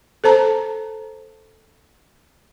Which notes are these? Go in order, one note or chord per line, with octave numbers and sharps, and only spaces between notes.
A4 C5 A5 A#5